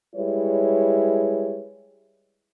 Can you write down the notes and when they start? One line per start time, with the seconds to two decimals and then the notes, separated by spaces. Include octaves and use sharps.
0.16 G3 G#3 E4 B4 C#5